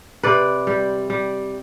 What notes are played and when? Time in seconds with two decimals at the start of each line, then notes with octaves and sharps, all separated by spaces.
0.23 C3 B4 D5
0.67 G3
1.10 G3